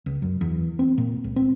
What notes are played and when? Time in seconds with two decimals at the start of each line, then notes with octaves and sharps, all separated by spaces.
0.06 C#2
0.22 F#2
0.41 E2
0.79 C4
0.98 A#2
1.24 C#2
1.36 C4